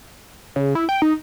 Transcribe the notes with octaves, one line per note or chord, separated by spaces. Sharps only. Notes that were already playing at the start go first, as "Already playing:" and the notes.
C#3
E4
G5
D#4